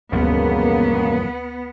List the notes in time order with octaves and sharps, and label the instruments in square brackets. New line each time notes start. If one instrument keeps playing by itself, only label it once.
[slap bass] E1 G2 F3 [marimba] D2 [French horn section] C#3 A#3 [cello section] B3